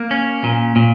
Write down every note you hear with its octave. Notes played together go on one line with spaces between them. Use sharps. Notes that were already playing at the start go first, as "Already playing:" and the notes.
Already playing: A#3
C#4
A#2
A#2